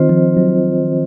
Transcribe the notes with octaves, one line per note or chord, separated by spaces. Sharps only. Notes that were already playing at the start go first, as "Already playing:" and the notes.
Already playing: D#3 C4 F4 C5 D#5
F3
F#3